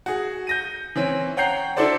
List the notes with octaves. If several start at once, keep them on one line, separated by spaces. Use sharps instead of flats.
F#4 G#4
G6 A#6 D#7
E3 C4 C#4
C#5 F#5 G5 A#5 G6 C7
D4 E4 F#4 A4 C5 D5